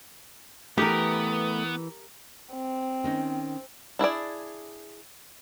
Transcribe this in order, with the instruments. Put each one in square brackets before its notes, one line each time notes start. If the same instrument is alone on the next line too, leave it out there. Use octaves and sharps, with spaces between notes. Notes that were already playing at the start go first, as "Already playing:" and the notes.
[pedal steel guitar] E3 [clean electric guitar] A3 [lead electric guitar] B3 [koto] G4 A#4
[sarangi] C4
[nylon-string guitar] D#3 C#4 D#4
[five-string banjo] D4 E4 G#4 D5